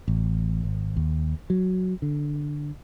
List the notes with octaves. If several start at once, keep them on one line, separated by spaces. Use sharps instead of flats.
A1
G#1
D#2
F#3
D3